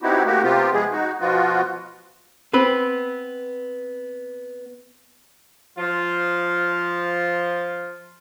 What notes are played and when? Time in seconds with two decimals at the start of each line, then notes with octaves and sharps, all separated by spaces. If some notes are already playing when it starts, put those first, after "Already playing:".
0.02 B3 C4 D#4 E4 F#4 G4
0.25 A3 A#3 F#4 G4
0.43 C3 B3 C4 F4 G4
0.73 F3 G#3 B3 G#4
0.92 D#4 F#4
1.20 B2 F3 B3 F4 F#4
2.53 B3 C4 B4
5.77 F3 F4